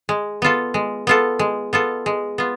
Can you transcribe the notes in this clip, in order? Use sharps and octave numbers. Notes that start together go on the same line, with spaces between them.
G#3
B3 F4 A4
G#3
B3 F4 A4
G#3
B3 F4 A4
G#3
B3 F4